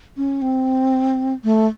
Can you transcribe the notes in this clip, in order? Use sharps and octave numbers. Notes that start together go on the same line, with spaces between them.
C#4
C4
A3